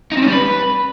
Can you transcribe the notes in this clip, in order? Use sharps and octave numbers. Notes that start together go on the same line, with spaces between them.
D#4
C4
C#4
G3
B4